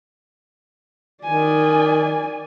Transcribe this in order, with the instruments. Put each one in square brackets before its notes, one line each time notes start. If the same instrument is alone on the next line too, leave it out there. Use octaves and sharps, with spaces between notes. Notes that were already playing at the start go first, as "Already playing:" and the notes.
[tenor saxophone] D#3 [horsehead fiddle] D5 G#5